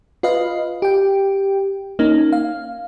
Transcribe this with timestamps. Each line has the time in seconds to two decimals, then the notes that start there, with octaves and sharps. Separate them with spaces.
0.23 F4 B4 D#5 F5
0.82 G4 G5
1.99 A#3 C#4 D#4
2.33 F5